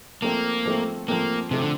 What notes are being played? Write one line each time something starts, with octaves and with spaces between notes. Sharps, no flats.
F3 A3 A#3 C4
F3 A3 C4
F3 A3 A#3 C4
C3 F3 A3 C4
D3